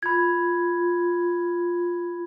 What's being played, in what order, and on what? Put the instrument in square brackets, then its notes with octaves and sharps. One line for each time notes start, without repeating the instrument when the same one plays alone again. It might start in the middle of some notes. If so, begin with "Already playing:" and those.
[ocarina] F4 [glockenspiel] B5 G#6